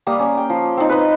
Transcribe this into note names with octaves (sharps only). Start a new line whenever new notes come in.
G3 A#3 D#6
C#4
G5
F3
C4 D#4
B4 D#5